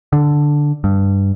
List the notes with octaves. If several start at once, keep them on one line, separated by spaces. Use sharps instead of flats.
D3
G2